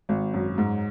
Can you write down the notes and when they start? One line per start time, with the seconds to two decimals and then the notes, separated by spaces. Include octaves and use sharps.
0.09 G#1
0.34 F#2
0.58 G#2